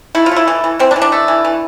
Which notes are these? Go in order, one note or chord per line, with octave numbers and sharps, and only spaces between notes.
A3 E4
F4
A3 E4
E3
E3
E3 C4
D4
E3
D4
A3
E3
E3